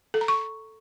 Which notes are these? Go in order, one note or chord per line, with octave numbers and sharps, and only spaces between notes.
A4
A#5
C#6